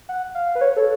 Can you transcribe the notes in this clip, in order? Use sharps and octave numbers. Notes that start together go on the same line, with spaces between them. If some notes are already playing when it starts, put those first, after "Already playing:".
F#5
F5
B4
C#5
A4